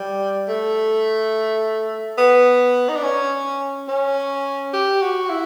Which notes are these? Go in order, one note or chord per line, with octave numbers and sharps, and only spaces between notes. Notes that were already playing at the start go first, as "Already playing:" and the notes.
Already playing: G3
A3
B3
D#4
D4
C#4
C#4
G4
F#4
E4